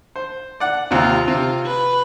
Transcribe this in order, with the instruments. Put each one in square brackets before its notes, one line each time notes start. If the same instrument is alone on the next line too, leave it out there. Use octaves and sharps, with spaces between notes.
[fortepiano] C5
D5 F#5
[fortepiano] D#2 C3 [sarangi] F4
[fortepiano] C3 [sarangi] F4
[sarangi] B4